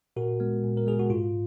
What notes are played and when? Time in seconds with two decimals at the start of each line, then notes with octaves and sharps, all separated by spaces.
0.16 A#2 F#4 A#4
0.40 G#3 B3
0.63 A#2
0.77 A#4
0.87 G#3 B3 G#4
0.99 F#4
1.10 G#2 F4